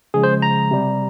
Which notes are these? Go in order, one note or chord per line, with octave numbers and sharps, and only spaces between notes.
C#3 F3 G#3 G#4
C5
A#5
C3 G3